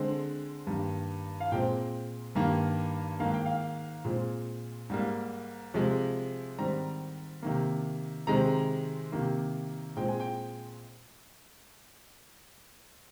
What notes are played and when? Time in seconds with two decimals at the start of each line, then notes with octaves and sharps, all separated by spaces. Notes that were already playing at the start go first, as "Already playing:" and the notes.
Already playing: D3 G#3 C4
0.67 G2 D#3 A#3
1.40 F5
1.52 A#2 G#3 C4 G5
2.35 G2 D#3 A#3
3.20 G#2 D#3 A#3 F5
3.34 G5
3.46 F5
4.05 A#2 G#3 C4
4.90 G#2 G3 A#3
5.74 C3 F3 G#3
6.58 G#2 D#3 G3 C4 A#5
7.43 C3 D#3 A#3
8.27 C3 D#3 G#3 C4 A#5
9.12 C3 D#3 A#3
9.96 A#2 G#3 C4 G5
10.09 G#5
10.20 G5